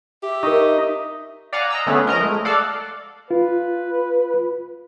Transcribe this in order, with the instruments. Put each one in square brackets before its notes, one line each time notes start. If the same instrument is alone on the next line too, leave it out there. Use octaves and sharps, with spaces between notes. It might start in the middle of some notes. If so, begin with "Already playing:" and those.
[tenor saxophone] G4 [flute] E5
[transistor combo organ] D#4 [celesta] A#4 C#6
[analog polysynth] D5 F5 F#5 G#5 A#5
D#5 A#5 E6
D3 A3 B3 C#4 G#4 B4
F3 A#4 D#5 A#5
G#3 A3
A4 D5 F5 F#5
[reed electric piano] F4 [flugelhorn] B4